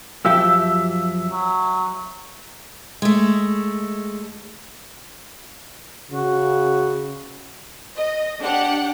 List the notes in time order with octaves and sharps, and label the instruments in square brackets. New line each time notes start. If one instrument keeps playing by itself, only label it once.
[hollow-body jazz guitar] F#2 F3 G4 [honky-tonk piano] E5 F5 E6
[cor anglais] F#3
[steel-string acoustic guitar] G#3 A3
[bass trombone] C#3 [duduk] F#4
[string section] D#5
D4 G4 F#5